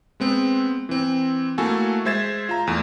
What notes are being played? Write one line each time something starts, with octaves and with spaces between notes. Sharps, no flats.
G#3 B3 C4
E3 C4
A3 A#3 E4 F#4 A4 G#5
G#3 C5 E5 G#6 A6 E7
F4 A#5
E2 A3